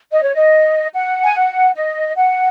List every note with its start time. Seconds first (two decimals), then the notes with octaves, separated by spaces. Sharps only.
0.12 D#5
0.22 C#5
0.34 D#5
0.94 F#5
1.24 G#5
1.34 F#5
1.75 D#5
2.16 F#5